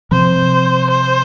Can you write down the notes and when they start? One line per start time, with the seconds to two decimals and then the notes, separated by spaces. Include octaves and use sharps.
0.11 C3 F3 C4 C5
0.90 C5